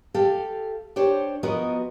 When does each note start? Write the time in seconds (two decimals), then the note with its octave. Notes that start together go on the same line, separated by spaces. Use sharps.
0.14 G4 A4 F5
0.96 D4 G4 C5 C#5
1.43 F3 B3 F#4 A#4 D#5